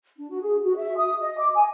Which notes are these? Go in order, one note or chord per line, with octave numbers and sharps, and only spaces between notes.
D4
F#4
G#4
F#4
E5
D#6
D#5
D6
G#5